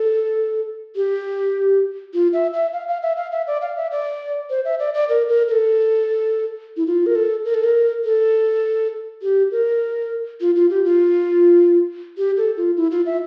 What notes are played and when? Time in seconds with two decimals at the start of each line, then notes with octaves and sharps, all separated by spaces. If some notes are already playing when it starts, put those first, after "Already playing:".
Already playing: A4
0.96 G4
2.14 F4
2.33 E5
2.53 E5
2.73 F5
2.88 F5
3.03 E5
3.17 F5
3.32 E5
3.47 D5
3.61 F5
3.77 E5
3.91 D5
4.50 C5
4.65 E5
4.79 D5
4.94 D5
5.09 A#4
5.29 A#4
5.48 A#4
5.52 A4
6.77 E4
6.87 F4
7.06 A#4
7.15 A4
7.45 A#4
7.54 A4
7.64 A#4
8.05 A4
9.22 G4
9.52 A#4
10.41 F4
10.56 F4
10.70 G4
10.85 F4
12.18 G4
12.37 A4
12.57 F4
12.77 E4
12.91 F4
13.06 E5